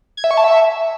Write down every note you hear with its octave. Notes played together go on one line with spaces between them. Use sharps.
G#6
E5
C#6
A5
E5